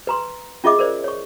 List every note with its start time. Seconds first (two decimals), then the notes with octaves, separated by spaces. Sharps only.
0.07 B4 A#5 C6
0.64 C#4 F4 G#4 D#5 E5 D6
0.79 A#4 C5 D5
1.04 C#5 C#6